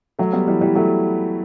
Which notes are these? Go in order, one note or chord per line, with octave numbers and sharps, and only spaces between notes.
F#3 A3
G3 B3
E3 G3
E3 G3
F#3 A3